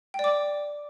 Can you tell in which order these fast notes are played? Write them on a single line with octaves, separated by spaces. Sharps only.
G5 D5 D6